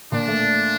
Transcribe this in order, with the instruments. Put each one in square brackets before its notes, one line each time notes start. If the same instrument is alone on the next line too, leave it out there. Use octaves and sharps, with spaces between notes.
[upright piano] A#2 [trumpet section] D4
[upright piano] A3